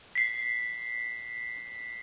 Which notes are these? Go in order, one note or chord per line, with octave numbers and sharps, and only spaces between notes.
B6 C7